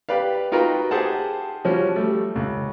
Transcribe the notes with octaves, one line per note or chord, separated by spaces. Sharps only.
G4 B4 D5 F5
D#4 F4 F#4 A#4 B4 G5
G4 G#4 C5 F#5 A5
F3 G3 C#4 F#4
G3 A3
C#2